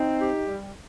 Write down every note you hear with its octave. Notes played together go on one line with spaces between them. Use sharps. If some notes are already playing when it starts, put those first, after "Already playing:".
Already playing: C4 D#4
G4
G3